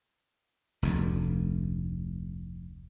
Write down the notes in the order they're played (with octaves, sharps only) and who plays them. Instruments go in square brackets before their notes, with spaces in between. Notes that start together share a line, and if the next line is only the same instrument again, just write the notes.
[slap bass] F1 D2